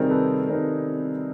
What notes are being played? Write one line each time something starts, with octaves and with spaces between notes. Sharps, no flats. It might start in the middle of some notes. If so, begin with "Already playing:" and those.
Already playing: C3 D#3 G3 C4 D#4 G#4 A#4
A4 B4
C3 D#3 G3 C4 D#4 A#4 C5